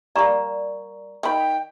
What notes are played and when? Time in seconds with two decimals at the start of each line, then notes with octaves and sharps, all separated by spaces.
0.16 G3 A#3 D5 A#5 C#6
1.23 D#3 G5 B5